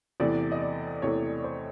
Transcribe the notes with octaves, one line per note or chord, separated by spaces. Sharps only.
E2 C3 E3 A3 D5
D#5
D5
E2 C3 E3 A3 C#5
C5